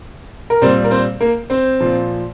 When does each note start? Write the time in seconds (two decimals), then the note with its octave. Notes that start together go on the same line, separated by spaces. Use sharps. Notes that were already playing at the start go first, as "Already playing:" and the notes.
0.50 A#4
0.62 A#2 G3 C4 C5
0.84 A#4
0.91 C4 C5
1.21 A#3 A#4
1.50 C4 C5
1.80 A#2 F3